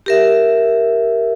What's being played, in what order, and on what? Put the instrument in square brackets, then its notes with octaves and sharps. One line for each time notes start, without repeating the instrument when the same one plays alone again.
[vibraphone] G4 A#4 E5